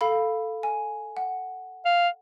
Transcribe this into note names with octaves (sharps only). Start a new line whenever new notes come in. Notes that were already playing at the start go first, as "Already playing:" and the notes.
A4 F5 B5
G#5
F#5
F5